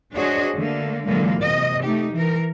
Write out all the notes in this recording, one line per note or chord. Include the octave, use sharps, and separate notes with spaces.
D4 F#4 G#4 C5 C#5 D#5
D3 A3 A#3
A#2 D3 E3 F#3 G#3 A#3
C3 D#5
A3 D#4 G4
E3 A#4